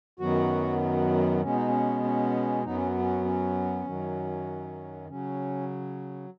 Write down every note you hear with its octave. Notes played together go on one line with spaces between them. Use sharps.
F#2 D#3 F#3 B3 F#4
B2 G#3 B3 C#4
D#4
C#4
C#4
F#2 F#3 B3 D#4
C#4
C#4
C#4
F#2 D#3 F#3
C#3 F#3 C#4